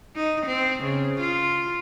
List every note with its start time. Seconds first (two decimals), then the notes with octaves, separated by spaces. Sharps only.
0.16 D#4
0.46 C4
0.83 C#3
1.20 F4